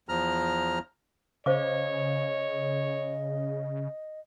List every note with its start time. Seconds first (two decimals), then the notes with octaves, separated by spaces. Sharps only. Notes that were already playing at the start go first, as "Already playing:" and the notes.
0.09 E2 F3 A#5 F6
1.46 C#3 C5 C#5 D#5 F5 D6